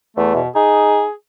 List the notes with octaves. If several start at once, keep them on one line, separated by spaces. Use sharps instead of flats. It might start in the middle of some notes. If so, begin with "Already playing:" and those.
E2 A3
B2
D#4 G#4